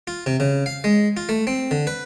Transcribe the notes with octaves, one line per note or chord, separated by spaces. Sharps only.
F4
C3
C#3
F5
G#3
F4
A3
C4
D3
B4